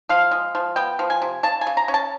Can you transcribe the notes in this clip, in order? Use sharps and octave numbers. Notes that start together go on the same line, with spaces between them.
F3 F5
G#3
F3
B3 G5
F3
G#5
C3
C#3 A5
G#5
C#3
A#5
C#4
A5